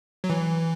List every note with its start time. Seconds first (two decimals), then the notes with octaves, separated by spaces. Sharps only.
0.24 F#3
0.30 E3